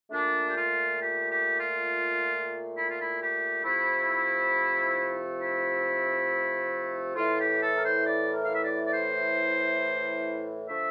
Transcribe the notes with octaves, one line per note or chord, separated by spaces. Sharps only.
A#2 A3 D4
G4
F4
G4
G4
F4
E4
F4
E4
G4
C3 F3 A3 E4
E4
A2 E3 A3 F4
G4
A4
A#4
C5
D5
A#4
F5
E5
D5
D5
C5
D3 F3 A3 E5